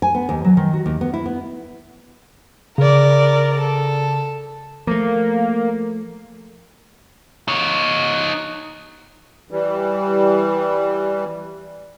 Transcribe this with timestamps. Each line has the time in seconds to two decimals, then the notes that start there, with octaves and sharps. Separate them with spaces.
0.02 G#5
0.15 B3
0.29 D#2
0.45 F#3
0.57 D#3
0.73 F#4
0.86 D#2
1.01 B3
1.13 E4
1.26 B3
2.78 C#3 A#4 D5
3.61 A4
4.87 F3 A3 A#3
7.48 D#4 C#5
9.51 E3 G3